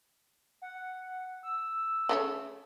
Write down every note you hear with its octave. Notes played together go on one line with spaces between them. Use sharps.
F#5
E6
C#3 A3 C#5